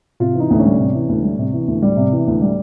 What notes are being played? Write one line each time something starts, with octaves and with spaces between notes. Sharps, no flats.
C3 F4
E3 D#4
D2
C#4
G3
C3
E3
D2
G3
C3
E3
D2
G3
C3
E3
D2
G3